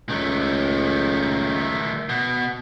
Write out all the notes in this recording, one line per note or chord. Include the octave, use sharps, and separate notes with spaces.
C#2 D#3 A3
B2